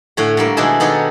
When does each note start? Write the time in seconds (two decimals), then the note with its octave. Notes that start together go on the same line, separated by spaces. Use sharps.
0.17 A2 D3 C#5 F#5
0.37 D3 G3 A#3 A#4
0.57 B2 D#3 G#3 D4 E4 G#4
0.80 D#3 B3 D4 D#4 A4 C#5